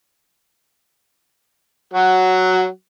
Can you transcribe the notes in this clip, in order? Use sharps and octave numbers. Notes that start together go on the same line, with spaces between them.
F#3 F#4